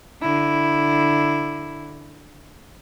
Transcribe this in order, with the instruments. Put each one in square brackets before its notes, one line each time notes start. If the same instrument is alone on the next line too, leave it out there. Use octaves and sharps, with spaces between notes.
[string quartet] D3 E4